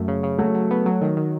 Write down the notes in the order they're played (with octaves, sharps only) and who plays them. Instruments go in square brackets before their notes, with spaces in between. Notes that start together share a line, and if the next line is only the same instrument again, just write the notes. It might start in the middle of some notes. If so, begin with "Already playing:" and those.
Already playing: [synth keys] F#2 A3
C#3
C#3
[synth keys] F#3 [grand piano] A3
[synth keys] F#3
B3
F#3
D#3
D#3